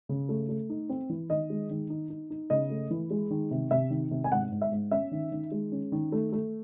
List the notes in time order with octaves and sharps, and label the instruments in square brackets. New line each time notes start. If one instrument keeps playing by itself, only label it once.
[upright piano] C#3
A3
A3
D#4
C4
E3
D#3 D#5
G#3
D#3
D#4
D#4
D#4
C#3 D#5
A3
E3
G#3
D#3
C3
C3 E5
D#3
C3
G#5
G#2 F#5
G#2
E5
G#2
C#4 E5
D#3
D#3
G#3
C#4
D#3
A3
A3